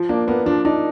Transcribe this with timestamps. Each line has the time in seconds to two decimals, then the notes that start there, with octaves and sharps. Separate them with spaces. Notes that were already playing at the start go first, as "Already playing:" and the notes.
Already playing: F3
0.09 A#3 D4
0.27 A#3 B3
0.46 F3 D4
0.65 D4 D#4